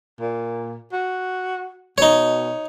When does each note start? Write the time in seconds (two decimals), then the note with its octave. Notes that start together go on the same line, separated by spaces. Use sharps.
0.20 A#2
0.92 F#4
1.98 B2 D#4 C#5